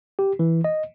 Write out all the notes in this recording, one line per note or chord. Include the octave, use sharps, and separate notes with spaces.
G4
E3
D#5